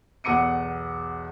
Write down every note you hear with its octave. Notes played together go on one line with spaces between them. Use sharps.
B1 E2 F#5 D6 C#7 D#7